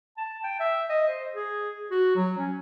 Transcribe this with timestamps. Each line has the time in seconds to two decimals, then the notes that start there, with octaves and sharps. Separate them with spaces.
0.17 A5
0.44 G5
0.60 E5
0.90 D#5
1.08 C5
1.34 G#4
1.91 F#4
2.16 F#3
2.38 C#4